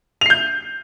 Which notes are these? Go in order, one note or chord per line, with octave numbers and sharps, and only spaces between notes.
G6 C7 F7